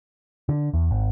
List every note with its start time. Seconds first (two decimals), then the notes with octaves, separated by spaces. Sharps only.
0.49 D3
0.74 E2
0.91 G#1